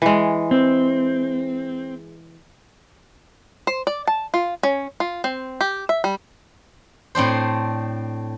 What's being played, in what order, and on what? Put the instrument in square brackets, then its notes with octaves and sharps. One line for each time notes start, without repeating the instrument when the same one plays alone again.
[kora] E3 G#3
[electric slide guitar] C4
[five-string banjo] C5
D5
A5
F4
C#4
F4
C4
G4
E5
G3
[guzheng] A2 C4 D4 C5